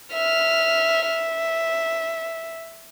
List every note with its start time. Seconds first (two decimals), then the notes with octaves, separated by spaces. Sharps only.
0.13 E5 F6
1.07 E5